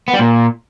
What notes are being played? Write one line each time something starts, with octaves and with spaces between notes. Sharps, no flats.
B3
G3
A#2